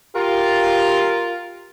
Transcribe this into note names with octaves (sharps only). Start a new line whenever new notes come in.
F4 G4 A#4